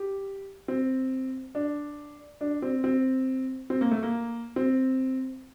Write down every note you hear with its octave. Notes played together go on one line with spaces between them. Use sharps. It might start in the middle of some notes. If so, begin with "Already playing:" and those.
Already playing: G4
C4
D4
D4
C4
C4
C4
A#3
A3
A#3
C4